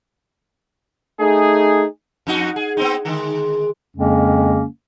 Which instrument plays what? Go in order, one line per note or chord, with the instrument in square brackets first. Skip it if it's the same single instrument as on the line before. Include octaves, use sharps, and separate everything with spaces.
[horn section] A3 D#4 G#4
[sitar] F2 D#4 F#4
G#4
B3 C4 D#4
D3 D#3 G#3
[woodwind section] F2 C#3 G#3 A#3 C#4